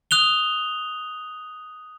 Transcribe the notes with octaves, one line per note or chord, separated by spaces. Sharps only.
D#6 F#6 F7 G7